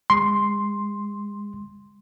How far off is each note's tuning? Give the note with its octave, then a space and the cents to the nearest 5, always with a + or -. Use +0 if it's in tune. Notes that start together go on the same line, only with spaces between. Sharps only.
G#3 -30 C6 +0